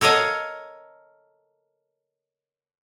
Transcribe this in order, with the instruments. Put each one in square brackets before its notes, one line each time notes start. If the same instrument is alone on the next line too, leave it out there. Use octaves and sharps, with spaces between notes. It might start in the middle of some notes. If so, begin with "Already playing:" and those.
[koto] A4 A#4 C#5 D#5 F5